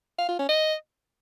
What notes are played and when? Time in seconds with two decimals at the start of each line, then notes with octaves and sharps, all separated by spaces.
0.19 F5
0.29 F4
0.39 C#4
0.49 D#5